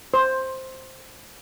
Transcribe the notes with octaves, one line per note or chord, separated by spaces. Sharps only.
C5